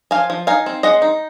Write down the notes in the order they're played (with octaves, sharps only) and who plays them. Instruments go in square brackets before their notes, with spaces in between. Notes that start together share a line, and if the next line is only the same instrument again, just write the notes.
[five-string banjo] F3 F5 G#5
F3
D#4 F5 G#5
C4
G#3 D#5 F#5
D#4